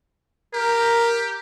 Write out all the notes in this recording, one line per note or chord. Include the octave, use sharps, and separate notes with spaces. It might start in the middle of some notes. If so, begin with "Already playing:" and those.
G4 A#4